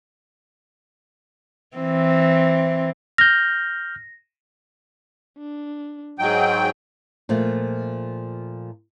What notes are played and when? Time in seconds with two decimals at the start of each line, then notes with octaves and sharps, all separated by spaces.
1.77 E3 C4
3.18 F6 G6 A#6
5.38 D4
6.19 G#2 F#3 G#4 D#5 G5
7.29 A#2 F3 A3